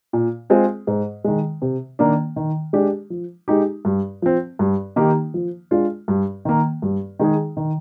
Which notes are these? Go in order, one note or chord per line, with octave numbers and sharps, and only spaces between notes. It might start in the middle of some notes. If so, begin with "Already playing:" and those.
A#2
G#3 C4 F4 G#4
G#2
D#3 G#3
C3
D#3 A#3 D4
D#3
G#3 D4 G4
F3
G#3 D#4 G4
G2
F3 C4
G2
D#3 A#3 D#4 G4
F3
G#3 D4 F4
G2
D#3 A#3
G2
D#3 G#3 D#4 G#4
D#3